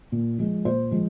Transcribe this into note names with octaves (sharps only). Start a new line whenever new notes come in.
A#2
F3 G#3
A#2 C5
F3 G#3